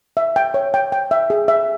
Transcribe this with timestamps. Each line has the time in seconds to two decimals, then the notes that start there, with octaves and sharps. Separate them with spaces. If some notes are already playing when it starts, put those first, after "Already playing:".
0.17 E5
0.36 G5
0.54 C#5
0.74 G5
0.92 G5
1.11 E5
1.30 G#4
1.48 E5